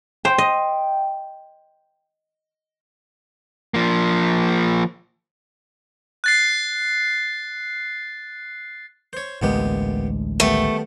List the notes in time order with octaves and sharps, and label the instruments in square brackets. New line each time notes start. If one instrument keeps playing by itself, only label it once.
[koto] C5 [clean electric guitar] G5
[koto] D#5
[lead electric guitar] F3 A#3
[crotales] F#6 A6 C7
[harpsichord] C5 C#5
[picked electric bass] A1 D2 G#3 [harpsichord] A#2 B3 G4
[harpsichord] D#3 G3 B3 [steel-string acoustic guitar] A3